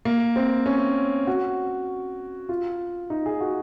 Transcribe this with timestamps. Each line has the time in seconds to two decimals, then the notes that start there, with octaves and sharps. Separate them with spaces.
0.05 A#3
0.36 C4
0.66 C#4
1.27 F#4
2.49 F4
3.10 D#4
3.26 G#4
3.41 F#4